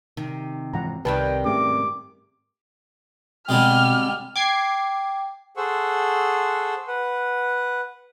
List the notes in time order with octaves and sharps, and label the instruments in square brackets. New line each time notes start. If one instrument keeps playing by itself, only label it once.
[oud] C3 [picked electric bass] D#3
[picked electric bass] G#2 E3 F3 [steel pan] F#5 A#5
[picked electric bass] C2 [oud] C3 D#3 G3 [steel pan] B4 A5 [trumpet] G5
[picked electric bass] G#2 A3 C#4 [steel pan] G4 G#4 E5 [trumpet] D6
[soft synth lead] B2 [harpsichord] D3 G3 G#3 [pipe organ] C4 [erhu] F6
[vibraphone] G5 [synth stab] D6 G#6 C7
[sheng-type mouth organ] G#4 A4 C5 F#5 C#6 E6
B4 F#5